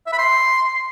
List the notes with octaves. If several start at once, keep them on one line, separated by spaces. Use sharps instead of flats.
E5
B5
C6